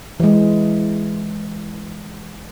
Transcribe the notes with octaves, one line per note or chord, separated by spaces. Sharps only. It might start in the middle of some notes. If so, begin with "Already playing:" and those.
E3 G#3